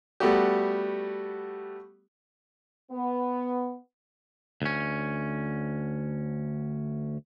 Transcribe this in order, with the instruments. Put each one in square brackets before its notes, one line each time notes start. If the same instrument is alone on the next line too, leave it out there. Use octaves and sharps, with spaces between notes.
[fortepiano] G3 A3 B3 F#4 G4
[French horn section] B3
[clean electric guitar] D2 C#4